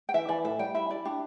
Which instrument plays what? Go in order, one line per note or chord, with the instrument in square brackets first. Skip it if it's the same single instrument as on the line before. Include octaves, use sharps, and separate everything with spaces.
[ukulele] G5
[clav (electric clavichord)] E3 [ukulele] E5
[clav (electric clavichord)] E3 [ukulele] D5
[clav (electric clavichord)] A2 [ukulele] E5
[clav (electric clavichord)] G3 [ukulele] G5
[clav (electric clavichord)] E4 [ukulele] E5
[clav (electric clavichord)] E4 [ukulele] D5
[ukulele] D4 [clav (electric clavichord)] G4